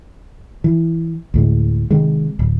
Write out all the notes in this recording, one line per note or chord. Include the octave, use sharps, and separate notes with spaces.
E3
D2 A2 G#3
C3 D#3 G#3
D1